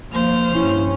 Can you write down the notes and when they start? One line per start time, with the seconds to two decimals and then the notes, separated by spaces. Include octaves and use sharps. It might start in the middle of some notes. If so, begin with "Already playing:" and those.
0.12 D#2 F3 A#3 C5 F6
0.55 G2 C#4 E4